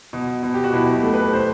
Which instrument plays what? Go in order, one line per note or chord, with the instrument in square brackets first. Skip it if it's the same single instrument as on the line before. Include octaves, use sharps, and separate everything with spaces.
[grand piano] B2
B2
G4
F#4
B2 E4
G4
A3
B4
C5